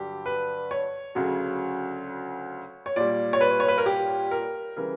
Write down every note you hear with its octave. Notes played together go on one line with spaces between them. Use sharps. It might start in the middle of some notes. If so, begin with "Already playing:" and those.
Already playing: G2 D3 F#3 G4
B4
C#5
D2 C#3 F#3
C#5
A#2 G3 D5
C#5
B4
C#5
B4
A#4
G4
A#4
C#3 E3 G3 A#4